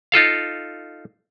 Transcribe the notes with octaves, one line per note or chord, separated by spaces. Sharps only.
D#4 F4 A4 F5